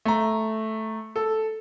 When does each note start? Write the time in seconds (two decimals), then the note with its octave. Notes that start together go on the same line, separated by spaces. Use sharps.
0.05 A3 A#5
1.16 A4